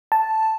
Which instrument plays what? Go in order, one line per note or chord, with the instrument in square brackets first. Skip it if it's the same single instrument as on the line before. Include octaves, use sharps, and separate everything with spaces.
[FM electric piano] A5